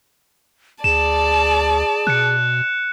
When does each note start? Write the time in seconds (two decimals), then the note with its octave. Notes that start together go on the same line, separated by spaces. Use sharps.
0.84 D2 G#4 D5 A5 E7
2.07 B2 F#6 C#7